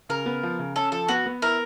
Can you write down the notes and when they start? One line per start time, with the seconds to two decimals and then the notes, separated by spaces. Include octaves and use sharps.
0.09 C#3 A#4
0.26 B3
0.43 F3
0.59 C#3
0.76 C#4 A4
0.92 F3 A4
1.08 B3 F#4
1.26 B3
1.42 E4 A#4